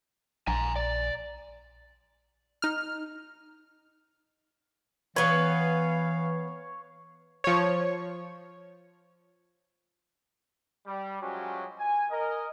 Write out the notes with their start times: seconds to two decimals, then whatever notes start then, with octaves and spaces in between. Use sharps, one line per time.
0.48 A#1 G#5 A#5
0.76 D5
2.62 D#4 F6
5.16 E3 B3 B4 C#5 F5
7.44 F3 C#5
10.87 G3
11.21 F3 F#3 G#3 C#4 F#4 G4
11.79 G#5
12.11 A#4 D#5